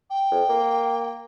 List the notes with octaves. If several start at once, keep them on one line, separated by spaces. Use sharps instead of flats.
G5
F2
A#3